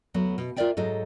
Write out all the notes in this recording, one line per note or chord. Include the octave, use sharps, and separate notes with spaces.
D2 F#3 B3
B2
F4 A#4 C5 D5 E5 G5
G#2 F#3 A4 D#5